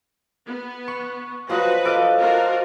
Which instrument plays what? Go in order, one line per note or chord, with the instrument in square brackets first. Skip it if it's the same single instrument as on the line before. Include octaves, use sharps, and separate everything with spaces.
[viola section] B3
[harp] C#6
[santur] F3 F#3 D#5 [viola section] F#4 B4 [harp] C5
[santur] A4 C5 [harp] D#5 F5 D6
[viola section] F4 F#4 A#4